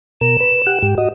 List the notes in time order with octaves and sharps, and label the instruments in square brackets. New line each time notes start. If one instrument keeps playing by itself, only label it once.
[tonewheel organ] B2 A#4 [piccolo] E7
[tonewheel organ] B4
G4 F#5
G#2 G4
F#4 D#5